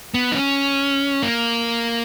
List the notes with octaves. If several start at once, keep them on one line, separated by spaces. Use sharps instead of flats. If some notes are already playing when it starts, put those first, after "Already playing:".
B3
D#4
C#4
A#3